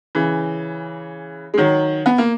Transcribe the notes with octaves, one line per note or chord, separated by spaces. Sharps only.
C#3 E3
G#3
D#3 F#3
B3
A#3